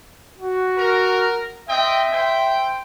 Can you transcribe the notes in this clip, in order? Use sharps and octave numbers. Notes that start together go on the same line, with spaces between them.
F#4
A#4
C4 D#5 E5 G5
C5 G5